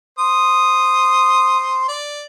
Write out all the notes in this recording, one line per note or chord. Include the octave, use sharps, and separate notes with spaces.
C5 D#6
D5